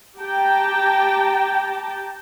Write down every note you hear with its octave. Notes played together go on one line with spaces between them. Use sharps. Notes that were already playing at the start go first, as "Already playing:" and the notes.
G4 G5 A5 A#5